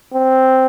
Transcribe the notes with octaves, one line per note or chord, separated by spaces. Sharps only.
C4